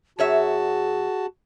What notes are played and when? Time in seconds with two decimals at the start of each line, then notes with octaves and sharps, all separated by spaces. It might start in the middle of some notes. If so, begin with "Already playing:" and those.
0.19 F#2 F#4 G#4 C#5 E5 A5